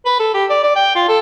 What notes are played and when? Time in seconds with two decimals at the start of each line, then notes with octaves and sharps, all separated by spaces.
0.06 B4
0.19 A4
0.34 G4
0.50 D5
0.63 D5
0.76 G5
0.95 F4
1.08 A4